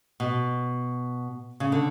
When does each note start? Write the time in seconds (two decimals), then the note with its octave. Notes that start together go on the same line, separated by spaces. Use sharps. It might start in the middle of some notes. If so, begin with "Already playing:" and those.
0.20 B2
1.60 C#3
1.72 D3